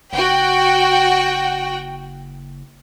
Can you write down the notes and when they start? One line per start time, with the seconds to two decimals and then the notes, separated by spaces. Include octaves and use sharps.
0.13 F#1 F#4 G5